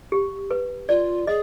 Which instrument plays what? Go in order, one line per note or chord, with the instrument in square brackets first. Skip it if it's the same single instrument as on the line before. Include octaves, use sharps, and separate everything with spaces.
[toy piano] G4
B4
[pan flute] F4 [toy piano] D5
[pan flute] G#4 [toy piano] D#5